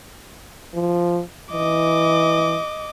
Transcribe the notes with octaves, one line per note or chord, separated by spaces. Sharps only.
F3
E3 D#5 D6